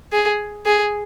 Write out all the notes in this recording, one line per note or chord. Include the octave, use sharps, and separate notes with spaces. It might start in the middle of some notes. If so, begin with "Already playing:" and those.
G#4
G#4